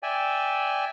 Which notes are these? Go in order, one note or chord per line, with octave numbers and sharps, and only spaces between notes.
D5 E5 G5 G#5